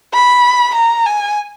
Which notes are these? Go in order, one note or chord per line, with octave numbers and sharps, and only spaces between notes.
B5
A#5
G#5